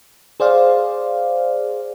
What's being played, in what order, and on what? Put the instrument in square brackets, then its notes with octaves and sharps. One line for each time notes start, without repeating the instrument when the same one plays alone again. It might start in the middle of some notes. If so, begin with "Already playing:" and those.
[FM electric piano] G#4 C5 D5 F5